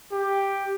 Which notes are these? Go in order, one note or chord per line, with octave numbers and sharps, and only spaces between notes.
G4